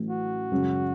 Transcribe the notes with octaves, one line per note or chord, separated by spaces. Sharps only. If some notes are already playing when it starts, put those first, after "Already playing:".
Already playing: A1 A2 F#3
F#4
F#2 C#3 G#3 C#4